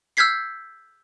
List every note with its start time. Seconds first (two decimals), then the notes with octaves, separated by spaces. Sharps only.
0.17 E6 F6 G6 G#6 B6 C7